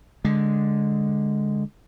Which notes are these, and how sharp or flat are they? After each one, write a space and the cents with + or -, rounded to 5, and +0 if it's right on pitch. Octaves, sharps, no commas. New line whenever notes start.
D3 +0 G#3 +0